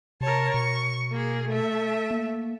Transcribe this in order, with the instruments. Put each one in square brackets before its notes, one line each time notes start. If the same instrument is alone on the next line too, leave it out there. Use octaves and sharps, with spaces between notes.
[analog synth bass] C3 [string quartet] A#4 C#5 A5
[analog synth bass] B2 [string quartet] C#6
[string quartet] A#3 G#4
A3 E5
[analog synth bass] A#3